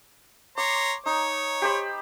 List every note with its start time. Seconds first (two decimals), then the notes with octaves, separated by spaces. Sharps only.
0.57 C#5 A#5 C6 D6
1.06 D#4 C#5
1.62 G4 C5 B5